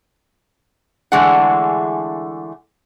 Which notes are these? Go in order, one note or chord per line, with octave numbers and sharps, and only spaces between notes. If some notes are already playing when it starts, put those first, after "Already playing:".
D3 E3 G#3 A3 G#4 F#5